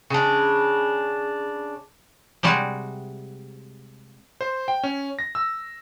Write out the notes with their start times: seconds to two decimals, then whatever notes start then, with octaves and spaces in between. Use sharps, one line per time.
0.10 C#3 D4
2.43 C3 G3 G#3 F#4
4.41 C5
4.68 G5
4.83 C#4
5.19 A#6
5.35 E6